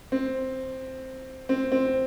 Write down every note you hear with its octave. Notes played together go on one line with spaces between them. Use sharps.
C4
C4
C4